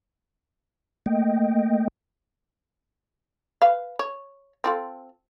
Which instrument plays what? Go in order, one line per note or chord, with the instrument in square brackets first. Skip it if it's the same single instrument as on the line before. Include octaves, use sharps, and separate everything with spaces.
[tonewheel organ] A3 A#3 D#5 G5
[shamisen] B4 F5
C#5
C4 F4 A4